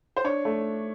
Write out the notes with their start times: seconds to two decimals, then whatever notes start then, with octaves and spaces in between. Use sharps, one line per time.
0.17 C5
0.24 D4 C#5
0.45 A3